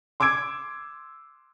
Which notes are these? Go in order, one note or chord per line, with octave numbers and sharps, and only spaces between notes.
C6 D6 E6 G#6 D7